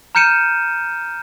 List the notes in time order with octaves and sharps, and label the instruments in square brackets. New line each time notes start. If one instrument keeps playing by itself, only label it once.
[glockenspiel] A#5 F6 G6 C#7 D#7 E7